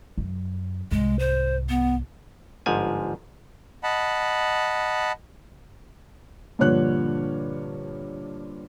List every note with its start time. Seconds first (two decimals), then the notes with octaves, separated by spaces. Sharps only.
0.18 F#2
0.91 C2 G#2 G#3
1.19 C5
1.69 B3
2.66 G1 G#2 F3 G#5
3.83 D#5 F#5 A5 B5
6.59 G2 A#2 D3 F3 C#5 F#6